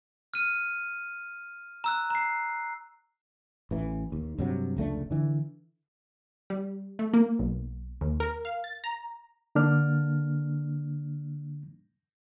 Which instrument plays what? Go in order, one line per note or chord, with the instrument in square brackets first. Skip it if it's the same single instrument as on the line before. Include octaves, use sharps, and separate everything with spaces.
[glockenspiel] F6 D#7
A#5 E6 F#6
A#5 C7
[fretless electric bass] A1 E3
D#2
G2 C3 F#3
F1 C#2 A3 D4
D3 E3
[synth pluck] G3
A3
A#3
B1
D#2
A#4
F5
A6
A#5
[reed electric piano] D3 A#3 D4 F6